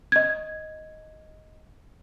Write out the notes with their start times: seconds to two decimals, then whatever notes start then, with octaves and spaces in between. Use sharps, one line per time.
0.12 D#5 G#6